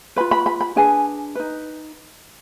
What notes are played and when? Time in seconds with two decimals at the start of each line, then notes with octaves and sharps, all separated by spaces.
0.16 B4 B5
0.20 F4
0.31 B5
0.46 B5
0.61 B5
0.76 D4 G#4 B4 G#5
1.35 D#4 B4